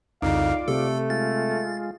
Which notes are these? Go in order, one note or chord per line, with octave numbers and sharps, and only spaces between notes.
C2 F2 C#3 D#4 F4 D5 F5
C3 A3 A4
G#3 F4 A6